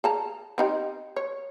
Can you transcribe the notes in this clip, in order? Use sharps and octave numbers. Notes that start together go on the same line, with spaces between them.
G#4 A5 A#5
C4 D#4 G4
C#5